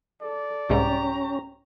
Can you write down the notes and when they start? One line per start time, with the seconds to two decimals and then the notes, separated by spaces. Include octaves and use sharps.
0.22 A4 D5
0.70 C2 G#2 C#4 G4 A#5